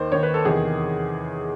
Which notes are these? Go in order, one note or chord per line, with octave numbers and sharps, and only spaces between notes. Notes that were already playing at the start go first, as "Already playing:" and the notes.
Already playing: D#2 D#3 C5
D#2 D#3 C#5
B4
A4
E2 C3 D#3 G#4